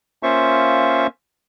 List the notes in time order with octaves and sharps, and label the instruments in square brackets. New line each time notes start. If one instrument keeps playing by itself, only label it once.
[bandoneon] A#3 C#4 F4 C5 E5 C#6